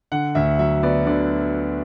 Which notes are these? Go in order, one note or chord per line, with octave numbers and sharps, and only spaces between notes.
D3 F#5
D2 E5
F#3 E5
B3 D5
D3 D5